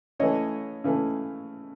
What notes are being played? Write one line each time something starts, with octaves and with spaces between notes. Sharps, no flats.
C#3 E3 A3 C#5 D#5
C#3 E3 A3